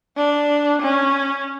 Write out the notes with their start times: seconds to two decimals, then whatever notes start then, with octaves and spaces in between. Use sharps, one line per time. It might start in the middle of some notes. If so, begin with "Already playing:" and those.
0.17 D4
0.82 C#4